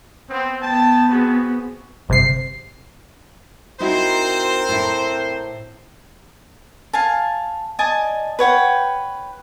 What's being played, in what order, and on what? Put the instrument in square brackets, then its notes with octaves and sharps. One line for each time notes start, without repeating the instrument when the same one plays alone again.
[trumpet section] B3 C4
[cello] B3 [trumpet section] G5 A5
[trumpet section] C4 F#4 G#4
[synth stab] G1 C3 C7
[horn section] C4 A#4 C5 [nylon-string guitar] D#4 E4 F#4
[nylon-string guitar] A2 E4
[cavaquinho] F5 G#5 A5
D5 D#5 G#5 A5
B4 C#5 F#5 G5